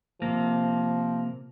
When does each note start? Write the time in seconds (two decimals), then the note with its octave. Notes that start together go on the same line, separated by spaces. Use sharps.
0.22 C3 F3 A#3